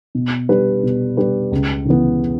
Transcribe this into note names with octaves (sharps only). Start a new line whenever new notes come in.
B2
G3 D4 G4 B4
B2
G3 D4 G4 B4
C#2
C#3 E3 B3